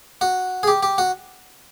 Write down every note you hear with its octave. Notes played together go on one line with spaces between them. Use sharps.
F#4
G#4
G4
G4
F#4